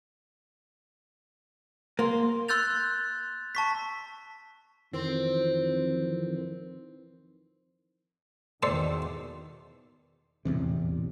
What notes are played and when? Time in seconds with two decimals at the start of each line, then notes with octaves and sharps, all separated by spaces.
1.99 A#3 C6
2.48 C6 E6 F#6 G6 A6 F7
3.55 A5 C#6 B6
4.93 F2 D#3 E3 C4
8.63 E2 B2 D#3 A4 C5 D5
10.45 D#1 A1 E2 C3